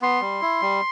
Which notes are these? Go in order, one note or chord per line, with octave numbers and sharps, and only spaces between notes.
B3 C6
G3
E4
G3